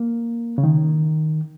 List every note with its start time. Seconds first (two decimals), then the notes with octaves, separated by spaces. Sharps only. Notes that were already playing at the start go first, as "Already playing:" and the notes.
Already playing: A#3
0.58 C#3
0.64 D#3